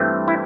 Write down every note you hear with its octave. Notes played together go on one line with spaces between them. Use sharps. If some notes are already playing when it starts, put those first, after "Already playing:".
Already playing: G2 E3 A3 C4
E4